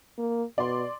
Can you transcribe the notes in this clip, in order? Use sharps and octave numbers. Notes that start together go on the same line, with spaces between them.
A#3
B2 D5 C6